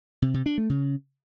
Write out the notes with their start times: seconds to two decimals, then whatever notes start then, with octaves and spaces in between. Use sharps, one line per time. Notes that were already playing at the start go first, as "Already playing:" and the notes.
0.22 C3
0.34 C3
0.46 D4
0.58 A3
0.70 C#3